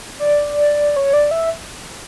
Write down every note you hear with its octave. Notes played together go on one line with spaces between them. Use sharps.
D5
C#5
D5
E5